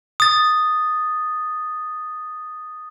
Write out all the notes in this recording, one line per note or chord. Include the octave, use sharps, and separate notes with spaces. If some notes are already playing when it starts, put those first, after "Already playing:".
D#6 A6